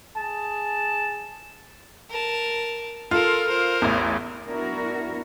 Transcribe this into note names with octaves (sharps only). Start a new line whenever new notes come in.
G#4 A5
A#4 A5
F4 A4 A#4
A#4 C5
A1 E2
B3 D4 E4 F#4 A#4